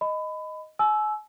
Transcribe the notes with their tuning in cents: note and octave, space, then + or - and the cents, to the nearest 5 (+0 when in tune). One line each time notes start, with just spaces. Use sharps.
D#5 +0 B5 +25
G#5 +40 E6 +0